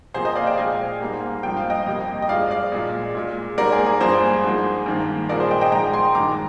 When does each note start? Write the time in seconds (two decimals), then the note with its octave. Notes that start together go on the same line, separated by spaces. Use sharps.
0.14 C3 F3 A#3 G#4 C5
0.25 C5 D#5
0.35 D5 F5
0.46 D#5 G5
0.57 A#2 G#3 F5 G#5
1.00 G#2 G3 A#3
1.43 G2 F3 A#3 G5
1.57 F5
1.70 D#5 G5
1.86 F2 C3 G3 A#3
2.22 D#5
2.29 G2 F3 G#3 D5 F5
2.51 D5 F5
2.72 A#2 G#3
3.15 A#2 G#3
3.58 G#2 G3 A#3 A#4 D5
3.72 G#4
3.86 G#4
4.00 G2 F3 A#3 G#4 C5
4.44 G#2 F3 G#3
4.86 G2 D#3 A#3
5.29 A#2 F3 G#3 A#4 D5
5.40 G#4 C5
5.51 D#5 G5
5.61 D#5 G5
5.72 G#2 F3 G#3 G5 A#5
5.93 G#5 C6
6.15 G2 D#3 G#3 A#5 D6